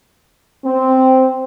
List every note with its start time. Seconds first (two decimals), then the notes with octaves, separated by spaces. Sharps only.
0.65 C4